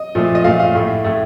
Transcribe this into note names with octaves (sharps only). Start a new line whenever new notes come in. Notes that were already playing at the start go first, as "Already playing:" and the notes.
Already playing: D#5
A#2 F3 A3
D#5
A#2 F3 A3 F5
F5
A2 A3
A2 A3